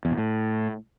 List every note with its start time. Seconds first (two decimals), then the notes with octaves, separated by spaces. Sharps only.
0.05 E2
0.11 B2
0.18 A2